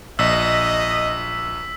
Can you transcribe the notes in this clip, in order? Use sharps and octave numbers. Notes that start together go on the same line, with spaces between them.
A#1 D#5 E6 B6